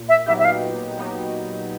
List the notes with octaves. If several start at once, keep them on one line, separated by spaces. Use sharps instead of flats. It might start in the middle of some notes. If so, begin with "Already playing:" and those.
Already playing: A#2
E5
F#3 B3 D#4 G4 E5
E5
F5
A#2
F#3 B3 D#4 G4